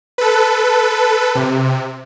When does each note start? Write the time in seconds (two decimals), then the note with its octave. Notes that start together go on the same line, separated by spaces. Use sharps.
0.18 A4 B4
1.35 C3